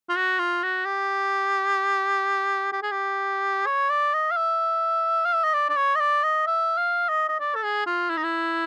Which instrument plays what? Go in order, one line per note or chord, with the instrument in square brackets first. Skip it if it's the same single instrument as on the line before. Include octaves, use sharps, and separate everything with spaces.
[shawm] F4
F#4
F4
F#4
G4
G4
G#4
G4
C#5
D5
D#5
F5
E5
F5
E5
D#5
D5
D5
C#5
D#5
D5
D#5
E5
F5
D#5
D#5
D5
A4
G#4
F4
E4
D#4
E4